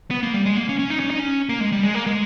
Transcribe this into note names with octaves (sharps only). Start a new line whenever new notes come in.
B3
A#3
G3
G#3
A#3
C#4
C#4
D#4
C#4
D#4
C#4
A#3
G#3
G3
G#3
A#3
G#3